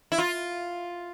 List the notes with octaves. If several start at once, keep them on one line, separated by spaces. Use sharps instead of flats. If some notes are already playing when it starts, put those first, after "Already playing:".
E4
F4